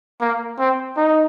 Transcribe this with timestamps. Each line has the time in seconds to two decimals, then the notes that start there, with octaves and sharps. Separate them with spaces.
0.21 A#3
0.59 C4
0.97 D#4